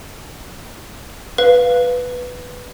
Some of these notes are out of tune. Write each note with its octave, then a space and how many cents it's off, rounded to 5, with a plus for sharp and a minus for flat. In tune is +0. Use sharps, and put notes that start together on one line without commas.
B4 +0 F5 +0